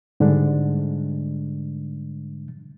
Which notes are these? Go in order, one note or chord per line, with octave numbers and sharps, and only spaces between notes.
G#2 D3 G3 G#3 D4